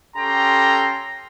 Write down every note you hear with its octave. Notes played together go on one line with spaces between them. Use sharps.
C#4 G4 A4 G5 A#5 C6